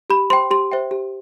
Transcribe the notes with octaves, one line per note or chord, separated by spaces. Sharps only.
G4 B5
C5 G5 C6
G4 C6
C5 E5 G5
G4